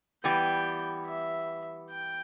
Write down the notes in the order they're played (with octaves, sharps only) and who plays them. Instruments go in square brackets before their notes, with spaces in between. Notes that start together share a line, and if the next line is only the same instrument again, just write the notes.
[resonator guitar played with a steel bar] E3 G3 B3 G4 [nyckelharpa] G5
[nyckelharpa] E5
G5